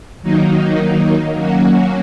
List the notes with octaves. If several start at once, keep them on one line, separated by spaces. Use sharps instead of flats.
D#3 F#3 A#3 D#4
F#3 A#3 C#4 F#4